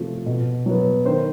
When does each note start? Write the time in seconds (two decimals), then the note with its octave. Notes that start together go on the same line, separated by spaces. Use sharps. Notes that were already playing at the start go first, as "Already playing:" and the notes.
Already playing: C3 F3 A3
0.26 B2
0.66 F#3 B3
1.05 D#3 C5